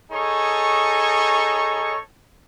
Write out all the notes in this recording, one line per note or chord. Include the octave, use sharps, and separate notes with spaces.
D#4 G#4 A4 C#5 C#6